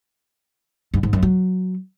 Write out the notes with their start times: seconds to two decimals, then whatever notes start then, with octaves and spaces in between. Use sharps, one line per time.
0.94 G2
1.03 G#2
1.13 F#2
1.23 F#3